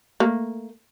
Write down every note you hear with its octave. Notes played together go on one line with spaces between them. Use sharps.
A3 A#3